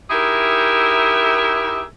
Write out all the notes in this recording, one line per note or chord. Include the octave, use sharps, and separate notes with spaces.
D#4 E4 G4 G#4 A#4 E5